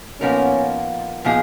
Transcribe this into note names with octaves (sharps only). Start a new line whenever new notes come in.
A#2 F3 B3 C#4 D#4 A#4
A#2 F3 B3 D#4 G#4